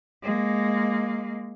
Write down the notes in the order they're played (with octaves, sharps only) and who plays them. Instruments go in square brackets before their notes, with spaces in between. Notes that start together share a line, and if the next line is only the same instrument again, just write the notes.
[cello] G#3 A#3